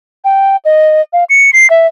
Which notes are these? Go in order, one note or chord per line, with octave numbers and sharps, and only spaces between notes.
G5
D#5
F5
C#7
C7
E5